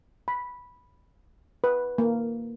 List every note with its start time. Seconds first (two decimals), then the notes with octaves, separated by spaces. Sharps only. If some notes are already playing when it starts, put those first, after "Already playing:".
0.28 B5
1.64 B4
1.98 A#3